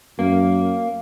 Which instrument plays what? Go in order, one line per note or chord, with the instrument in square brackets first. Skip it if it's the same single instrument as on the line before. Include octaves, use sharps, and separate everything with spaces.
[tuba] F#2 [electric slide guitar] A#3